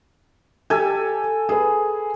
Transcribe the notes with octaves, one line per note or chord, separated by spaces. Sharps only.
G4 A4 G#5
G#4 B4